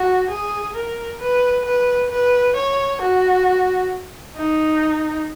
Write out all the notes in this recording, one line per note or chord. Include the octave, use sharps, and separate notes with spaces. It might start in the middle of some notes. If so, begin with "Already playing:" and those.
Already playing: F#4
G#4
A#4
B4
B4
B4
C#5
F#4
D#4